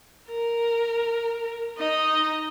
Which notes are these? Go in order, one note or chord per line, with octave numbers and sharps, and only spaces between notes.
A#4
D#4 D#5